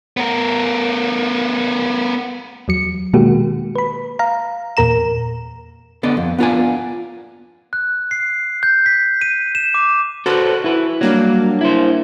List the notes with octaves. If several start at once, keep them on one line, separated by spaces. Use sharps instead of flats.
B3 A#4
E2 F#3 C#7
B2 D#3 G#3 A#3 F#4 G4
B4 B5
F5 A#5
E2 A#2 A#4 A#5 E7
D3 B3 D5 D#5
F2
B3 D4 F4 C5 D5 G#5
F#6
C7
G6
B6
D#7
E7
D6
F#4 A4 B4 C5
E4 B4
F#3 G3 A#3 D4
E4 C5